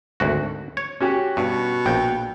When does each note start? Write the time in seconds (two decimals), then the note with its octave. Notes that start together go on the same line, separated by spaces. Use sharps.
0.20 G#1 D2 F#4
0.77 C#5
1.00 C#4 F#4 G4
1.37 G2 B2
1.86 A#1 G5